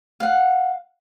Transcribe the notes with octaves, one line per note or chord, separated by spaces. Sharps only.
F5 F#5